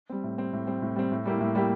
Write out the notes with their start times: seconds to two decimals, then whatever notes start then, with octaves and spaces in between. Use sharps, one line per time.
0.10 G3 C4
0.24 A2
0.38 G3 C4
0.53 A2
0.67 G3 C4
0.82 A2
0.96 G3 C4
1.11 A2
1.26 G3 A#3 E4 G4
1.40 A2
1.55 G3 A#3 E4 G4